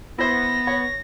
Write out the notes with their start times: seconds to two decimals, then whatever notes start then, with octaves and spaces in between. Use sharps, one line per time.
0.19 B3 E4 C5 A#6
0.67 C#5